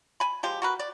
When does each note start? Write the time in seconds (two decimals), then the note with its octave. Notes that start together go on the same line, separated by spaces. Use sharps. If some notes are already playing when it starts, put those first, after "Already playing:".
0.20 G#5 B5
0.43 F3 G#3 G4
0.62 F#4 A#4 B4
0.79 D5